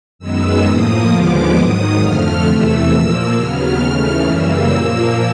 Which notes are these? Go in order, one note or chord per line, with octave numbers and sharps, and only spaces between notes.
F#2 D#3 G#3 B3 E6
A2 F3 A#3 D#6
D#2 D3 F3 G#3 B3 D6
G#2 D#3 F#3 D#6
F2 D3 F3 A3 F6
E2 C3 E3 A3 E6
A#2 F3 A#3 E6
D#2 C#3 F#3 B3 F6
D#2 C#3 E3 A3
F#2 C#3 E3 G3 A#3 E6
A#2 F3 A#3